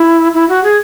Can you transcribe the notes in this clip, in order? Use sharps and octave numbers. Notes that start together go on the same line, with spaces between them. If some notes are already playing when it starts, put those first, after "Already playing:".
Already playing: E4
E4
F#4
G#4